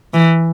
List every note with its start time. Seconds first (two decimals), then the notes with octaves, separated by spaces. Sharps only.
0.14 E3